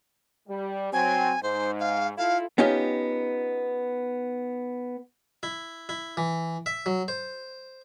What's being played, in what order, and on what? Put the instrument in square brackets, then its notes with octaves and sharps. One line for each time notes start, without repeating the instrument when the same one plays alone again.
[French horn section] G3
[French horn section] F#3 C4 [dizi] G#5
[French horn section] G#2 [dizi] C5
[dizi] F5
[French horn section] E4 F4 A4 [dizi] F5
[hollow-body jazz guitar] B3 C#4 D#4 F4 G4
[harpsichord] E4
E4
E3
E5
F#3
C5